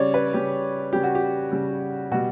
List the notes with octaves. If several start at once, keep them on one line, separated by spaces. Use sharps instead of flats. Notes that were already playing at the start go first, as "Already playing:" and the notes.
Already playing: C#3 G3 C#5 D5
B4
C#3 G3 G4
C#3 G3 G4
F#4
G4
C#3 G3
B2 G3 F#4